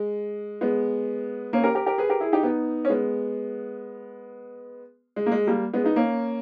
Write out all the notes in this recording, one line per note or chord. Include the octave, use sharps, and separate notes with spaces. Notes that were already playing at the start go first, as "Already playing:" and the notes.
Already playing: G#3
G#3 B3
A#3 C#4
G4 A#4
G4 A#4
G4 A#4
G#4 B4
G4 A#4
E4 G#4
D#4 G4
B3 D#4
C#4
G#3 B3
G#3
A#3
G#3
G3 A#3
G#3 B3
B3 D#4
A#3 C#4